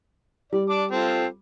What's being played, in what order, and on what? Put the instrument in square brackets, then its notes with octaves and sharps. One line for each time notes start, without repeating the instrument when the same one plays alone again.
[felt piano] G3 [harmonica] D5
[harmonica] D5 A5 D6
C4 F4 A4